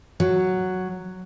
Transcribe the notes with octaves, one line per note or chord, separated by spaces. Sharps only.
F#3